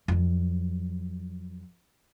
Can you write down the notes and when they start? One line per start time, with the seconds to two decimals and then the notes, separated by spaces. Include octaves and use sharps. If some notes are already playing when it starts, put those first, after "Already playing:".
0.08 F2 F#3